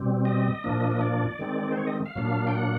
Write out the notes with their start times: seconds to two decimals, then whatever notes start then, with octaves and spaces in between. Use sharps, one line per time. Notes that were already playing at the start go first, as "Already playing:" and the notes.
Already playing: B2 G3 C4
0.25 D#5
0.64 A#2 F3 A#3 D4
0.92 D#5
1.01 D5
1.39 D#3 G#3 C4
1.72 C5
1.77 C#5
1.87 D#5
2.06 F5
2.15 A#2 F#3 A#3 D4
2.47 G5
2.54 F#5